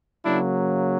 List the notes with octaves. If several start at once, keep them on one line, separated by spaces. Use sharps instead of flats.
C#3 F#3 A#3 D4 E4